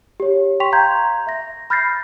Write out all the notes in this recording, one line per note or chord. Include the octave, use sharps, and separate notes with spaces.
G4 C#5
G5 C6 C#6 B6 F7
F5 A#5 C6 G6 G#6
E5 A#6
B5 F6 G6 A6 A#6 C7